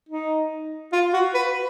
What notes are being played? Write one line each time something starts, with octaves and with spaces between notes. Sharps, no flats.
D#4
F4
F#4
B4